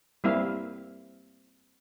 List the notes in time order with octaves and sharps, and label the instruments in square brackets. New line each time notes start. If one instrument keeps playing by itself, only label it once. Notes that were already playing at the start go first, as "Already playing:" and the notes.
[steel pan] G3 A#3 C4 E4 E5 F5